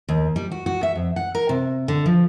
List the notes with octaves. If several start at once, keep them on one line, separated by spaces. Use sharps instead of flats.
D#2
G3
F#4
F#4
E5
F2
F#5
A#4
C3
D3
F3